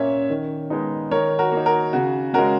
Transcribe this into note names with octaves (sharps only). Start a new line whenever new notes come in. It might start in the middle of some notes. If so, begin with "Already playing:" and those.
Already playing: A#2 A#3 C#4 C#5 E5
D#3
G#3 B3 D#4
D#3 A#4 C#5
F#4 A#4
A#3 D#4
F#4 A#4
C#3 F#4
G#3 C#4 F#4 A#4